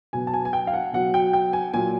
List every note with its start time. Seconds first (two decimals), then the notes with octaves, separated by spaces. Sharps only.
0.13 B2 F#3 G#5
0.27 A5
0.34 G#5
0.45 G#5
0.53 G5
0.67 F5
0.73 F#5
0.93 B2 F#3 F#5
1.14 G5
1.33 G5
1.53 G#5
1.74 A#2 F#3 G#5